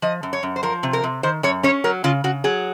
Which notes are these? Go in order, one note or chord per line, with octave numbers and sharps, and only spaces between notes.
F3 D#5
F#2
C#5
F#2
C5
F3 A#4
C3
A#4
C3
D#3 C5
F#2 C#5
C#4 C#5
F#3 A#4
C#3 F4
C#3 F#4
F#3 G#4